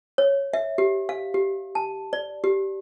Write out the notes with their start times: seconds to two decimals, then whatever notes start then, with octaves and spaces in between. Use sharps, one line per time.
0.18 C#5
0.53 E5
0.78 G4
1.09 F5
1.34 G4
1.75 A5
2.13 D5
2.44 G4